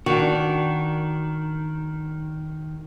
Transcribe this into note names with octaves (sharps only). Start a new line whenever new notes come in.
D#3 D4 F#4